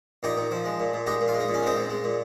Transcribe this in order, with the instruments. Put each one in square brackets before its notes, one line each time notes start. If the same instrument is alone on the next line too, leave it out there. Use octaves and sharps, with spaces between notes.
[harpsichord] A#2 D#4 G4
A#2
F3
G#3
A#2
A#2
G#3 D#4 G4
A#2
F4
G#3
D#4
A#2
C#4
G#3 C4 D#4
A#2
G#3
A#2